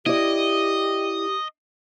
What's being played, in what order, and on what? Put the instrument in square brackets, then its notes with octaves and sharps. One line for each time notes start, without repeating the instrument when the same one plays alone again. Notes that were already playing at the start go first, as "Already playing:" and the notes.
[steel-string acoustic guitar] E4 D5 [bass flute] G4 [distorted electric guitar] D#5